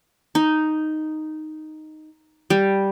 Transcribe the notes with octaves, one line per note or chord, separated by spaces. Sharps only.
D#4
G3